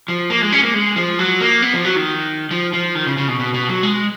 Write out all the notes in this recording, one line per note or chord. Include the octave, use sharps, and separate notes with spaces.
F3
A#3
G#3
C#4
A#3
G#3
F3
F#3
A#3
B3
F3
F#3
D#3
F3
F3
D#3
C#3
C#3
B2
B2
B2
F#3
G#3